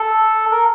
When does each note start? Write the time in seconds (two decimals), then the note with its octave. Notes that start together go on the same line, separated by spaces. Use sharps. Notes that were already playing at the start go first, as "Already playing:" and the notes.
Already playing: A4
0.52 A#4